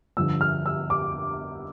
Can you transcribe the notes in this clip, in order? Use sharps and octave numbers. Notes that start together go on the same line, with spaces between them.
G2 D3 F3 E6
F6
E6
D6